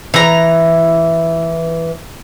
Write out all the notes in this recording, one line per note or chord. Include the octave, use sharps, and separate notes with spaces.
E3 A#5